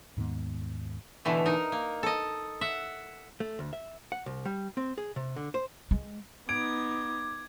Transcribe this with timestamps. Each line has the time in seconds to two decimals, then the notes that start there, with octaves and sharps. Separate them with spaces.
0.17 D#2 G#2 D#3 B3
1.25 B2 D3 E3 A3
1.46 D#4 A#4
1.72 A#3
2.03 A4 D#5
2.61 E5 F#5
3.40 A3
3.59 D2
3.73 E5
4.12 F#5
4.26 C2
4.45 G3
4.77 C4
4.98 G#4
5.16 C3
5.36 D3
5.54 C5
5.91 G#3
6.49 B3 D#4 D6 G#6 D7